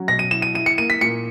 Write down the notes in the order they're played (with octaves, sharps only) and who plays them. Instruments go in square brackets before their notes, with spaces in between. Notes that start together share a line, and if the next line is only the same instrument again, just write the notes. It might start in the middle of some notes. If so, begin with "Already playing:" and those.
Already playing: [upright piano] F#3 C#4
[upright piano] B2 [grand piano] A#6
[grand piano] D#7
[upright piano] E4 [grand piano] E7
[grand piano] D#7
[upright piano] E4 [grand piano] D#7
[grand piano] C#7
[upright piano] A#3 [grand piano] D#7
[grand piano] B6
[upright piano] A#2 [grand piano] C#7